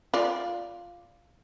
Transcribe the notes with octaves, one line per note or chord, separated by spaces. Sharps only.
F4 D5